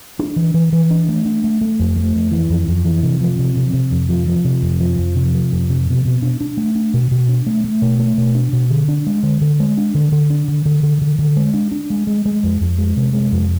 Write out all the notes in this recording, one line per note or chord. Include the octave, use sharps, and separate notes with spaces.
D4
E3
E3
E3
D4
A3
D4
A3
A3
F2
A3
F2
E3
F2
F2
E3
C3
F3
C3
C3
C3
F2
F3
F3
C3
F2
F3
F2
C3
F3
F2
C3
B2
B2
D4
D4
A3
D4
B2
B2
D4
A3
A3
B2
A3
B2
D4
B2
D3
D4
G#3
D3
D3
G#3
D4
D3
D3
D4
D3
D3
D3
D3
D3
G#3
D4
D4
G#3
G#3
G#3
F2
F2
G#3
C3
G#3
F2